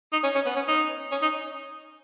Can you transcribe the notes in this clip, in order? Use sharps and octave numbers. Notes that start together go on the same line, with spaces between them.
D#4
C#4
C#4
B3
C#4
D#4
C#4
D#4